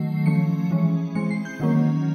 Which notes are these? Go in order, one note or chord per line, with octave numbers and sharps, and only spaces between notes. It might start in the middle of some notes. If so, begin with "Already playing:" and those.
Already playing: D#3 F#3 A3 C7
F3 A3 C#4 C#7
E3 G#3 C#4
E3 G#3 C4 C#7
C7
G6
D#3 F#3 A#3 C#4